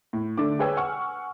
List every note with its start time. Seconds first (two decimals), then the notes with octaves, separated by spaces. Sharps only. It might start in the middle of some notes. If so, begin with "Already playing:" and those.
0.13 A2
0.38 D3 A3 D4 D6
0.59 G#4 B4 C#5 G5 G#5 E6
0.77 F#5 G#5 C#6 F6